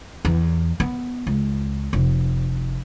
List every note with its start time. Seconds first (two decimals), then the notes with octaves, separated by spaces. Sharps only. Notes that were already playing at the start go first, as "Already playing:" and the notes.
0.25 E2
0.80 B3
1.27 C#2
1.93 F1